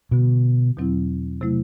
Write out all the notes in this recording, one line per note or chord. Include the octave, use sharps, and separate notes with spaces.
B2 D3 G3 B3 F#4
E2 B2 F#3 C4 E4
C3 F#3 A3 E4